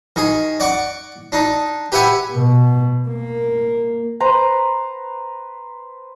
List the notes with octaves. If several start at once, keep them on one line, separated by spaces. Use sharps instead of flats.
D#3 G#4
D5 F#5 C#6 D6
D4 D#4
G4 B4 E5 F#5 G#5
B2
A#3
B4 C5 A#5